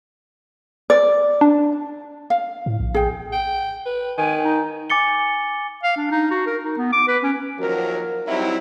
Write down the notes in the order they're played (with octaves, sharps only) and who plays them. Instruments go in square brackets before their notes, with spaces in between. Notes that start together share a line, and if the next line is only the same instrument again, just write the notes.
[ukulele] D5
[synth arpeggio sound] D4
[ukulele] F5
[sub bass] A2
A#1
[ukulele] G#4 G5
[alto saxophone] G5
B4
[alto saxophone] D#3 [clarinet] G#5
[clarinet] D#4
[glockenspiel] G#5 D6 A6 C#7 G7
[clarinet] F5
D4
D#4
F#4
A#4
D#4
B3
D6
B4
C#4
[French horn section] D#2 F3 F#3 F#4 A#4
F#3 G3 C4 D#4 E4